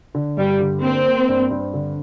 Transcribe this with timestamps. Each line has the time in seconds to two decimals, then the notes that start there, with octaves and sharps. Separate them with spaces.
0.15 D3
0.37 G2 G3
0.60 D3
0.83 A#3 C4
1.06 A#3
1.28 G2
1.51 G2
1.74 D3